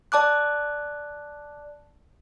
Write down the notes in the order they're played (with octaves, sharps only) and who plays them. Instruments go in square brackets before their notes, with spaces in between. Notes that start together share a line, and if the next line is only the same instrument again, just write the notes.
[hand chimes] D5 A5 D6 F#6